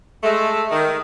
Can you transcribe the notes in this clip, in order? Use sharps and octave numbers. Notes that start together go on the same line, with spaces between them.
G#3 A3
D#3